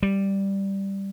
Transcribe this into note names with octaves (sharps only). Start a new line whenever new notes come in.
G3